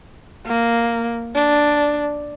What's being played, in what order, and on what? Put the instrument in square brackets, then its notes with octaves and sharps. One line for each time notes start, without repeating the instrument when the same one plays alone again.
[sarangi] A#3
D4